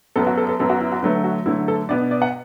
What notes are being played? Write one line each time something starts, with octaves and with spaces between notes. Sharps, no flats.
F#2 F#3 B3 A4
F#4
A4
A4
F#2 F#3 B3 A4
F#4
E4
F#4
D3 F#3 A3 B4
F#4
D3 F#3 A3 E4
A4
B2 B3 D4 D5
D5
F#5